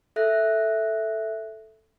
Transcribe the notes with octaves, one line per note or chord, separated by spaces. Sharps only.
A4 E5 F#6 A#6